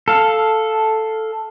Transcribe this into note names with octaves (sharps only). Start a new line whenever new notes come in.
A4 F5